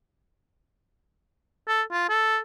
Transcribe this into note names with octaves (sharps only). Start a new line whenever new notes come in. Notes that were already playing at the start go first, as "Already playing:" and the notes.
A4
F4
A4